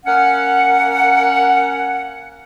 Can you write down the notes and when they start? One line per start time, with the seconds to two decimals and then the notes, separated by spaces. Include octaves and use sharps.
0.05 A#3 C#4 F#5